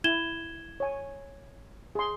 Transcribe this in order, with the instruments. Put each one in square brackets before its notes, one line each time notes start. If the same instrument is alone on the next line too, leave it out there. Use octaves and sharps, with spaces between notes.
[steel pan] E4 [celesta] G#6 E7 G7
[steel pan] C#5 G#5
G#4 C6